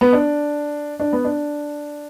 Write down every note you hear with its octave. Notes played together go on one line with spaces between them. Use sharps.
B3
D4
D4
B3
D4